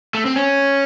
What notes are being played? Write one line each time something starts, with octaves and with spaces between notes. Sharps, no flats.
A3
C4
C#4